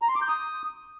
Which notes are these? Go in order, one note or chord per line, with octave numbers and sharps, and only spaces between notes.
A#5
C6
D6
G6
D#6